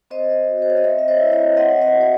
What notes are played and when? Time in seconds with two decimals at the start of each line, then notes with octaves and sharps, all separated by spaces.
0.11 C4 C5 D#5
0.47 F#4
0.62 C5
0.70 C#5
0.77 D#5
0.84 C4 C#5 E5
0.99 E5
1.08 C5 D#5
1.21 E4
1.32 C#5 E5
1.57 C4 D#5 F#5
1.81 C#5 E5
1.94 F#4
2.01 C#5